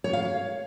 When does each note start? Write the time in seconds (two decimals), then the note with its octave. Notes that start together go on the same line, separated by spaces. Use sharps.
0.04 C#5
0.13 F5
0.22 C#5